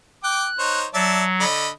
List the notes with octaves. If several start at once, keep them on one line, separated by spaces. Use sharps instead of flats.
G5 D6 F#6
D#4 C5 C#5
F#3 D5 E5 A5
D3 D#5 B5